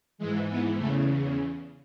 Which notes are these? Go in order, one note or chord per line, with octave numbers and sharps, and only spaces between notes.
G#2 E3 G#3
B3
E2 C#3 A3